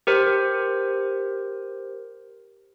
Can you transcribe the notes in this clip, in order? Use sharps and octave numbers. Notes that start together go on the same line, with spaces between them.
G4 A#4 C5